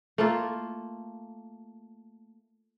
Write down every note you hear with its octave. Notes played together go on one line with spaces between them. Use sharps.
A3 A#3 F4